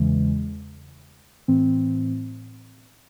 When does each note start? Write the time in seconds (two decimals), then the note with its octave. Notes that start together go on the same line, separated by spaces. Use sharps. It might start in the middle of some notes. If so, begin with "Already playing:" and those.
Already playing: E2 C#3 E3 G#3
1.48 A2 E3 C4